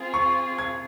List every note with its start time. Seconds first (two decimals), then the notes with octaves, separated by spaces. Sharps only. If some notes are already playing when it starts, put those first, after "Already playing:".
Already playing: C4 F4 G#4
0.14 C#6
0.58 G#6